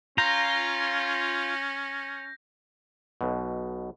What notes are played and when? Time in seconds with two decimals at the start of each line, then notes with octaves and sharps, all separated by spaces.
0.18 C#4 F4 A#5 G6 A#6
3.21 B1 B2